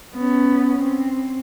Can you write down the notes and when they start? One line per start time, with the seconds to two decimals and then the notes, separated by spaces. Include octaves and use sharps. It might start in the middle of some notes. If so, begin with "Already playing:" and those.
0.15 B3 C#4
0.82 C4